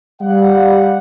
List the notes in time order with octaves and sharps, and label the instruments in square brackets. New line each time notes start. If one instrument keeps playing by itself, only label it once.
[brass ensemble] G3 F5 F#5